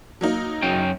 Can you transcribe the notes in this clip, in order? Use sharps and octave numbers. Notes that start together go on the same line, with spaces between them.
F#3 A#3 D#4
F#2 C#4 G5